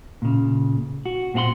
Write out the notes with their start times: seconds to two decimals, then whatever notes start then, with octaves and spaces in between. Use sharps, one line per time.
0.22 A#2 C#3
1.06 F#4
1.34 A#2 C4 G4 F#5 C6